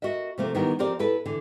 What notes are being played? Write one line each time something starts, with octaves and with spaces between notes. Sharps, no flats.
F#4 A#4 D#5 E5
C3 F3 A3 A#3 C4
D#3 E3 G3 B3 D#4 A#4
F3 C4 G4 A#4 D5
E4 A4 B4
D3 E3